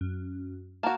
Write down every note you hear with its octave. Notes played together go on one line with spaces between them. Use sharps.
F#2
A#3 F#4 A5 F6